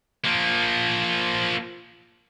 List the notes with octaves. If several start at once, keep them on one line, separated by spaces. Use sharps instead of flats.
F3 A#3